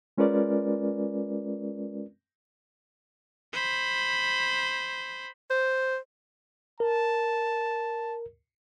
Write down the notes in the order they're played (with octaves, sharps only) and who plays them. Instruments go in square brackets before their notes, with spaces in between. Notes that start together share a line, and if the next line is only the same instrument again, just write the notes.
[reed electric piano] G#3 C#4 F4 A#4 B4 D5
[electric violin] C5 B5
[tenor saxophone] C5
[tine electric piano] A#4 [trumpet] A5